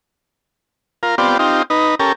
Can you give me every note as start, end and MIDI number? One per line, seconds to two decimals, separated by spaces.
1.03 1.15 65
1.03 1.15 70
1.18 1.38 59
1.18 1.38 60
1.18 1.38 65
1.18 1.38 67
1.18 1.38 74
1.39 1.62 60
1.39 1.62 63
1.39 1.62 65
1.39 1.62 67
1.70 1.95 63
1.70 1.95 71
2.00 2.12 61
2.00 2.12 67
2.00 2.12 69
2.00 2.12 70